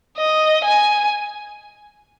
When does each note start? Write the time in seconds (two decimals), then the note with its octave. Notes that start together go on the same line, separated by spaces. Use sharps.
0.17 D#5
0.65 G#5